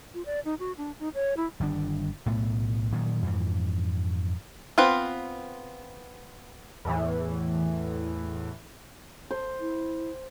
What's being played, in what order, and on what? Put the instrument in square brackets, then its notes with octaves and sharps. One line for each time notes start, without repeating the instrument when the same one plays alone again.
[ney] F4
D5
D#4
F#4
D4
D#4
C#5
E4
[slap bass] G1 D#3 G3 D4
B1 A2 A3 B3
A#2 D#3 F#3
F2 G#2 E3
[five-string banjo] B3 C4 F4 B4
[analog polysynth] E2 A2 E3
[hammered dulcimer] C5
[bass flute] E4